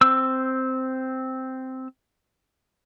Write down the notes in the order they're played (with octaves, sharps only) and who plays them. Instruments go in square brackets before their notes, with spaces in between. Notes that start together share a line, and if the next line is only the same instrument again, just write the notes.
[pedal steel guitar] C4 E6